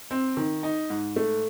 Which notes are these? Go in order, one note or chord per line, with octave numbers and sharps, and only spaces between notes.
C4
D#3
D#4
G#2
A3